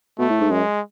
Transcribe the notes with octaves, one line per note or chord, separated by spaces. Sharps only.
B2 A3
A2
G#2
F#2 G#3